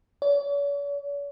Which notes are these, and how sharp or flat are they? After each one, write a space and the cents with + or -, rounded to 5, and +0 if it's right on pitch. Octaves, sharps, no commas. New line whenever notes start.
C#5 +45